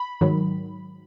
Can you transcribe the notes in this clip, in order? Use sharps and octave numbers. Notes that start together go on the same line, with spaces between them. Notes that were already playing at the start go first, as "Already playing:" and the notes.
Already playing: B5
G#2 D#3 F#3